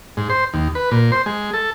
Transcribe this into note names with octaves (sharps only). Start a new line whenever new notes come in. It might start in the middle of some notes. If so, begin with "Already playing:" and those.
G#2
C5
D#2
B4
A#2
C5
G#3
A4